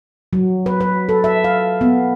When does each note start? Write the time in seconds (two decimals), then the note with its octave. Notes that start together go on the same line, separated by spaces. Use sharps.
0.33 F#3
0.66 B4
0.80 B4
1.09 A4
1.24 E5
1.44 F5
1.81 B3